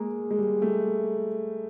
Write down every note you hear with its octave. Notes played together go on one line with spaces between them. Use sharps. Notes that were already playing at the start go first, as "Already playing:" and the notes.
Already playing: G#3 A#3
G#3
G3
A3